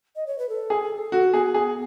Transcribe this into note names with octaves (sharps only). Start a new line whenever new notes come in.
D#5
C#5
B4
A4
G#4
F#4
B3 G#4
G#4